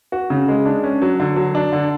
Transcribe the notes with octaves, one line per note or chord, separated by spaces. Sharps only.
F#4
C#3
G#3
D4
C#4
F#3
D3
F#3
D4
D3